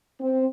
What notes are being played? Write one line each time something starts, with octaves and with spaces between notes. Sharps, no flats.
C4